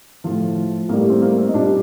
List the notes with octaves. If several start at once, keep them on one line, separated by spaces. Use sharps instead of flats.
A2 F3 F4
A2 G3 A#3
C4
A#3
C4
D#4
A#2 G3 D4